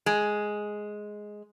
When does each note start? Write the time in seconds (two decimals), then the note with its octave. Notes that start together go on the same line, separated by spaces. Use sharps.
0.06 G#3